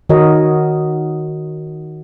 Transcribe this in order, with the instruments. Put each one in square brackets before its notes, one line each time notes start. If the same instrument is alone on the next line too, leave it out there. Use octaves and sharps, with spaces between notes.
[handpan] D#3 F#4 A#4 C#5 D#5